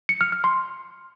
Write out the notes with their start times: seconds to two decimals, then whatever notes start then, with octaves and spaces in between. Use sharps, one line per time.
0.09 C#7
0.21 F6
0.32 F6
0.44 C6